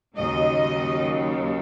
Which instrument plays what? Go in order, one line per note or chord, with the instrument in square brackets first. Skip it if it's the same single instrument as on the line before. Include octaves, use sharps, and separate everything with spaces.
[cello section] D#2 C#3 F#3 D#5